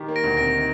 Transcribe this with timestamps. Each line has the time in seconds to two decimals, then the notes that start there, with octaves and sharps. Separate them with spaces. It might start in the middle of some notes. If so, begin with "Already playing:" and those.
Already playing: D#3 G4
0.08 A#3
0.16 A#6 D7
0.23 D2
0.37 C3 A#6 D7
0.53 D#3